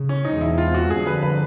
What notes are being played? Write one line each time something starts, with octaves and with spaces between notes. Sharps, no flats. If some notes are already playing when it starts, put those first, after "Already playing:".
Already playing: C#3
C#4
E2 B2 G#3 C4 D#4
E4
F4
F#4
G2 D3 F3 G#4
B4
B4